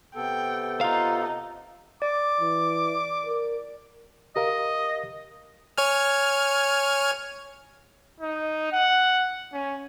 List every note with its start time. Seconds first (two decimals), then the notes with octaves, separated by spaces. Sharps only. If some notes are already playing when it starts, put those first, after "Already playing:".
0.15 C3 B3 A4 G5
0.81 D#4 F4 F5
2.02 D5 D6
2.41 E3
3.27 A#4
4.36 G4 A#4 D#5 F5
5.78 C#5 G#5 F6
8.20 D#4
8.72 F#5
9.53 C#4